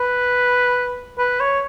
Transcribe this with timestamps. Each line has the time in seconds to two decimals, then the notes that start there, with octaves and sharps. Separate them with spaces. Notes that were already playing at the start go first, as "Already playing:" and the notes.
Already playing: B4
1.18 B4
1.40 C#5